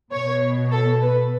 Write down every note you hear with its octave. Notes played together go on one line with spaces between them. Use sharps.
B2 C#5
A4
B4